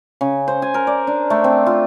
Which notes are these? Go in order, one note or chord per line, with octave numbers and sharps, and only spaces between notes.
C#3
C5
G#5
A#4
D5
D4
A3
C4
F4